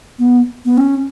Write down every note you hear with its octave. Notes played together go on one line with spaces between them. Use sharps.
B3
B3
C#4